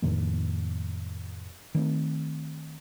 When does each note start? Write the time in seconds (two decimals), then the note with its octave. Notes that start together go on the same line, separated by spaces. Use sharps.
0.02 F2 A2 D#3 A#3
1.75 D#3 A3 C4